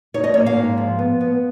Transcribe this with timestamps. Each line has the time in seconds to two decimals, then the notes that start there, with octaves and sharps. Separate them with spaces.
0.14 D#4 C#5
0.24 D#5
0.34 A#3 C#5
0.46 F5
0.57 G#2
0.78 F3
0.99 B3
1.21 B3